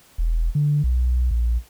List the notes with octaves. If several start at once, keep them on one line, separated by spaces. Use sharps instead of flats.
E1
D3
B1
A#1